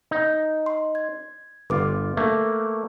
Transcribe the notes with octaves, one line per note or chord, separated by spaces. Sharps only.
D#4
C6
G#6
G1 F4 B4 D6
A3 A#3